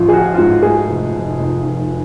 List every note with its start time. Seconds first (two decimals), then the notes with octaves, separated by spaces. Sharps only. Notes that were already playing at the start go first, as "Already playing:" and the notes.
Already playing: A1 F3 F4
0.08 G#4
0.13 F3 F#4
0.34 F4
0.38 G#2 F#4
0.62 A3 G#4
0.88 F1
1.13 F1
1.39 F1
1.64 F1